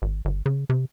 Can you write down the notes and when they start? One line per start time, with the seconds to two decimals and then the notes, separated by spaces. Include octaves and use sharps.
0.02 G#1
0.25 G1
0.46 C#3
0.69 C3